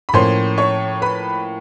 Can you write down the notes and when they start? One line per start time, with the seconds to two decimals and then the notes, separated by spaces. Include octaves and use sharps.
0.09 B5
0.14 A2 F3 A#3 C#4 C5 C6
0.58 C#5 C#6
1.02 B4 B5